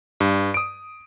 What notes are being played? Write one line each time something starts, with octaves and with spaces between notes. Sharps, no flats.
G2
D#6 D7